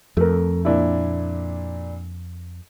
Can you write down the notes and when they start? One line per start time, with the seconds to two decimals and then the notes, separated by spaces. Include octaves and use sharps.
0.17 F2 A3 A#4
0.65 A#2 D4 E4